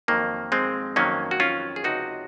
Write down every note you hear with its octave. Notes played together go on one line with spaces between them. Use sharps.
F2 D#3 F#3 A#3
G#3 C4
F2 D#3 F#3 A#3 C#4
F#4
C#4 F4
G#4
C#2 C3 F3 D#4 F#4